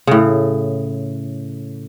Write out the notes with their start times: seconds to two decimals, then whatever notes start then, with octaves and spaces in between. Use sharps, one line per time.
0.07 A2 C#3